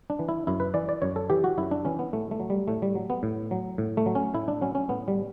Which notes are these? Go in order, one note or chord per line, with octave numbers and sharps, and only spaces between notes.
D4
E3
E4
F#2 E4
B4
E3 D5
D5
F#2 C#5
A4
E3 G4
F#4
F#2 E4
D4
E3 C#4
B3
A2 A3
A3
F#3
G3
A2 A3
G3
F#3
B3
A2
F#3
A2
A3
F#3
C#4
A2 E4
D4
F#3 C#4
C#4
A2 B3
G3